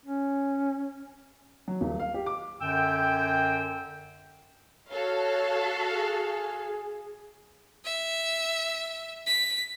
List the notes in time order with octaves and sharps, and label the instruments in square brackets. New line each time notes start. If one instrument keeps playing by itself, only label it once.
[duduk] C#4
[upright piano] F#3
D#1
F5
G4
D6
[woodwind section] F#2 D3 G5 E6
[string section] F#4 A4 F5 [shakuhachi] C#5
[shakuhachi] G#4
[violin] E5
B6